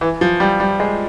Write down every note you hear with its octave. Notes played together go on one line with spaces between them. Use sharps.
E3
F3
G3
G3
G#3